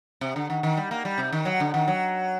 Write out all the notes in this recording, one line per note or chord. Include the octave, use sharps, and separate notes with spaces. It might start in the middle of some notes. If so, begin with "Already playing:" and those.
C3
D3
D#3
D#3
G3
A#3
G3
C3
D#3
F#3
D3
D#3
F#3